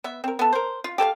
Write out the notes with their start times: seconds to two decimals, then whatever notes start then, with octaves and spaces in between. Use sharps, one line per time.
0.04 B3 E5
0.24 C4 A#4
0.39 B3 A4
0.53 A#4 C5
0.84 F4
0.98 G4 A4 C5 F5